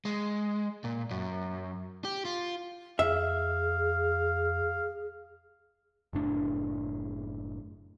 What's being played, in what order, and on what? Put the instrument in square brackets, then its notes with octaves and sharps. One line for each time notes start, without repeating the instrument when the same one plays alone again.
[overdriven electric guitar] G#3
A#2
F#2
G4
F4
[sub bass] F2 [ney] G#4 [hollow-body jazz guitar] E5 [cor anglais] F5
[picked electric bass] F#1 A2 D4